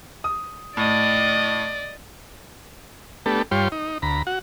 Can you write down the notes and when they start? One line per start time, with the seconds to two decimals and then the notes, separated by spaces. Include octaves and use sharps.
0.24 D#6
0.77 A2 D5 D#5 D#6
3.26 A3 B3 D4 G4 A4
3.51 G2 G3 F4 C#5 G5 C6
3.72 D#4
4.02 D2 A#5 B5
4.27 F#4 F#5